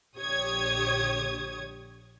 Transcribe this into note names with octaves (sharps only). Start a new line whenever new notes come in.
A#1 D3 G4 C#5 D#6 G#6